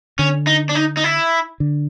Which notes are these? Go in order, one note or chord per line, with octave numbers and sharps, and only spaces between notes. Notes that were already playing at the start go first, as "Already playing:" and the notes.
D3 C#4
D#4
D4
D#4
D#4
E4
D3